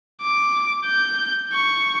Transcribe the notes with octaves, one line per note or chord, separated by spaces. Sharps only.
D6
G6
C#6